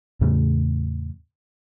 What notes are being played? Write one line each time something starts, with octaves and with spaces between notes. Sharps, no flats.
E2 A2 C#3